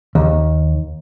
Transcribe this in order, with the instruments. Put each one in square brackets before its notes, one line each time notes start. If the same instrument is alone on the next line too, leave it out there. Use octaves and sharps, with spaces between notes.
[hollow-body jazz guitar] D#2